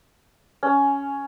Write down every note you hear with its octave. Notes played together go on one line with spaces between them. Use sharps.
C#4